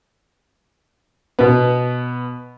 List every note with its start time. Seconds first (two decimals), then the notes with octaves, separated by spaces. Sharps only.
1.39 B2 B3